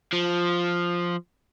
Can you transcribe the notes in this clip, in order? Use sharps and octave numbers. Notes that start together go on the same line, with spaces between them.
F3